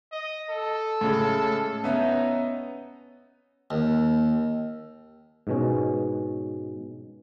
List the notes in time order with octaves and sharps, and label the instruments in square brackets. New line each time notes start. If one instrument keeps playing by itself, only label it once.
[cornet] D#5
A4
[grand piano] A2 C#3 G#3
[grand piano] B3 C#4 E5 [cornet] D#4
[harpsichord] D#2
[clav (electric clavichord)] G#2 B2 C#4